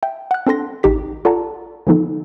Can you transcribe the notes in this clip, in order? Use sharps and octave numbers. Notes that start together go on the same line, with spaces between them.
E5 G5
F#5 F#6
C4 D4 A4 C6 A#6
A1 D#4 G4 B6
F4 A4 D5 F#5 A5 A#5
D3 E3 F3 B3 D#4 A4